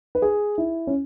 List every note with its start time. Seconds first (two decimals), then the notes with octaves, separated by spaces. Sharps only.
0.15 B4
0.22 G#4
0.58 E4
0.87 C#4